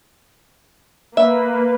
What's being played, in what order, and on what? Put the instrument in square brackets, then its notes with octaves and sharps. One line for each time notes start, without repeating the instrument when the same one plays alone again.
[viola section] A#3 B4 [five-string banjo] E5